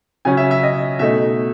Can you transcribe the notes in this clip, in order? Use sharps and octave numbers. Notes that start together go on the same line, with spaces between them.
C#3 F#3 C#4 G#5
E5
E5
D#5
B2 A3 D#4 E5